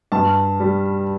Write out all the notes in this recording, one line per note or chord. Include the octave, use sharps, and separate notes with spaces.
G2 A5
G3